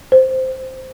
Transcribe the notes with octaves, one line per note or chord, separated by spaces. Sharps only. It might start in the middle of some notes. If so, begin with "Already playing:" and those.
C5